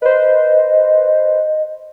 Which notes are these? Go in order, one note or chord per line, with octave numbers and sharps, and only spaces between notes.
B4 C5 D#5